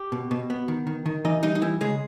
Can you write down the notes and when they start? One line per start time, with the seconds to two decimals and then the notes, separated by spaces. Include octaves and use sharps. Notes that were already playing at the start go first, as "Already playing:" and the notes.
Already playing: G4
0.12 B2
0.31 B2
0.50 B3
0.68 D#3
0.87 D#3
1.06 D#3
1.25 E3 D#4 D#5
1.43 G3 D#4 D#5
1.55 D#4
1.62 E3 E4
1.81 C#3 G#3 G#4